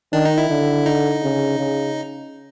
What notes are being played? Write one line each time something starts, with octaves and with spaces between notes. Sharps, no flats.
D#3 D4
D#4
E4
D3
D#4
C#3
C#3